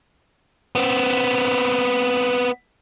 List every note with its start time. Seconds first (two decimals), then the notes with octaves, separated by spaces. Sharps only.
0.75 B3 C4